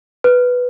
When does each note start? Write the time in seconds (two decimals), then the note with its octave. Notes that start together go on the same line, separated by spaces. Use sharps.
0.24 B4